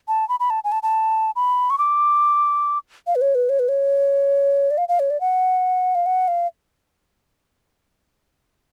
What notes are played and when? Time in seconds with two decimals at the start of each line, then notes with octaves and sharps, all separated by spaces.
0.08 A5
0.29 B5
0.40 B5
0.50 A5
0.64 G#5
0.72 A5
0.83 A5
1.36 B5
1.70 C#6
1.78 D6
3.07 F5
3.15 B4
3.22 C#5
3.35 B4
3.49 C#5
3.59 B4
3.69 C#5
4.71 D5
4.78 F5
4.89 F5
5.00 C#5
5.10 D5
5.21 F#5
5.95 F5
6.06 F#5
6.28 F5